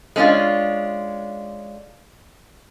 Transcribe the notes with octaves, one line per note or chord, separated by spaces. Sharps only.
G#3 C#4 D4 F4